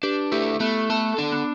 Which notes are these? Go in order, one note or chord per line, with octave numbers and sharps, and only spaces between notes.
D4 G4 B4
A3 E4 G4
A3 B3
B3 A4
D4
B3